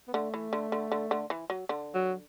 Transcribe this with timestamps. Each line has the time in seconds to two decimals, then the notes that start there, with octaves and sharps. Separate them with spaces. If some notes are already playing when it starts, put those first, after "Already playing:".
0.08 B3
0.14 D3 A3
0.34 E3
0.53 D3
0.72 D3
0.92 D3
1.11 D3
1.30 E3
1.50 F#3
1.69 D3
1.94 F#3